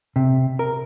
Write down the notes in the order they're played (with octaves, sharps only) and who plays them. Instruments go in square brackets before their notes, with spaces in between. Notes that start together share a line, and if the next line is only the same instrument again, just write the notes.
[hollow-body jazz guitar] C3
A#4